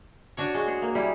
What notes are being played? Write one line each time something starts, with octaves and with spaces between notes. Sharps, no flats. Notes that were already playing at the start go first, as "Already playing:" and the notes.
D4 F#4 C#5
G#3 F#4
G#4 C#5
A#3
G3 E4 G#4